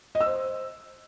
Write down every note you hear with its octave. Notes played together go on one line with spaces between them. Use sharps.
D#5
E6
C5